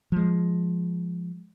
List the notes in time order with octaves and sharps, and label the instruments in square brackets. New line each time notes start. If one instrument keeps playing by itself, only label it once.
[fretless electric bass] F3 G#3